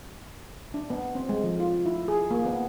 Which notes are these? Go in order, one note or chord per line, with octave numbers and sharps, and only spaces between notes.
D4
B3
C4
G#3
F3
F4
E4
G#4
A#3
B3